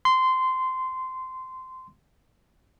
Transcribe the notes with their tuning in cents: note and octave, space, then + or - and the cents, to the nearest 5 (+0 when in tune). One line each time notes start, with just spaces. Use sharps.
C6 -15